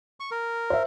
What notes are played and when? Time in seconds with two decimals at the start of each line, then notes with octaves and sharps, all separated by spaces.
0.20 C#6
0.31 A#4
0.70 C5 E5